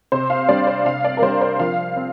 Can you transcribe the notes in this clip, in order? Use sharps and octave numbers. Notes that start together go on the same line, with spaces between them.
C3 C5
F5
G3 D4 D5
C5
C3 F5
D5
A#4
G3 D4 C5
C5
F3 F5
C4